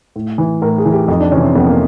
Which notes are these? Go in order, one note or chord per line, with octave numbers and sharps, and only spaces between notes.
A2
E3
A2 A#4
G#4
E3
G4
F2 D#4
D4
C3 E3 C#4
C4
F2 B3
A#3